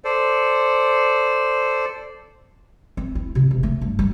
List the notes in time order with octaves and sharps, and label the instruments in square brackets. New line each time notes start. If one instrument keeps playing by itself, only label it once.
[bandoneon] A4 C5 D5
[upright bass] C4
E4
C3
E1
A3
G2
G3